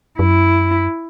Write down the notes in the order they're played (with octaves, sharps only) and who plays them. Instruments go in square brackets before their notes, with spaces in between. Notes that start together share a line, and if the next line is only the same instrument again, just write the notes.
[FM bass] F#2 [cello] E4